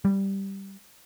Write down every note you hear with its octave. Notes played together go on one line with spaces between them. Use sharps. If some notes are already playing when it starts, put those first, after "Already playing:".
G3